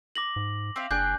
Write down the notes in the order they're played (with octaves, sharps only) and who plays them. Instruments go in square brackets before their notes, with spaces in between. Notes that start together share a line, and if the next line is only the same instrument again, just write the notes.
[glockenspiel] D6 A#6 F#7
[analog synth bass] G#2
[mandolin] C4 E5 F5
[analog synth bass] F#1 [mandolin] D4 G#4 G5 [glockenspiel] G6